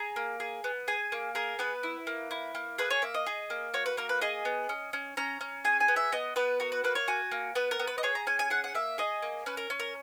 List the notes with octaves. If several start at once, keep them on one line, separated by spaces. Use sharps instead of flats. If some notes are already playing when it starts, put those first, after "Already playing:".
Already playing: G#4 A#5
A#3
G#4
B3
G#4 G#5
A#3
G#4 A#4
B3 B4
E4
A#3
E4
A#3
G#4 B4
C#5
A#3 E5
D#5
G#4
A#3
F#4 C#5
B4
A#3 A#4
B4
G#4 D#5
B3
C#4
C#4
C#4 A#5
C#4
G#4 G#5
G#5
B3
E5
B3 D#5
B3 B4
F#4 A#4
B4
A#3 B4
C#5
F#4 G#5
A#3
B3 B4
A#4
B3
B4
D#5
G#4 C#5
A#5
C#4 G#5
G#5
G#4 F#5
F#5
A#3 E5
G#4 D#5
A#3
C#4 B4
A#4
C#4
A#4